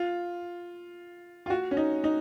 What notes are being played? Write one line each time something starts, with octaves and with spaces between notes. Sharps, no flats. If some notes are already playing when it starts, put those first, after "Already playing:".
Already playing: F4
F4
F#4
C#4
D#4
D#4